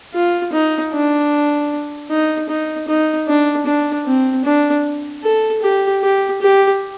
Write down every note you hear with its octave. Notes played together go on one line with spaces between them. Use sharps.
F4
D#4
D4
D#4
D#4
D#4
D4
D4
C4
D4
A4
G4
G4
G4